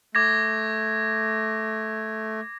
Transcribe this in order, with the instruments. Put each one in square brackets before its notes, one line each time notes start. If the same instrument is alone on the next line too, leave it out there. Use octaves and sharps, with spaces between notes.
[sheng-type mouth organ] A3 [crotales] D6 G#6 A#6